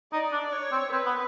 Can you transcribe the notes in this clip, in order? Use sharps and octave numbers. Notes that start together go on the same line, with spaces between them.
D#4 D5
D4
C#5
C4
C4 B4
B3